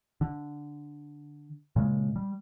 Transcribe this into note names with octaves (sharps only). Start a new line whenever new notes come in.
D3
A#2 C#3 G#3
G3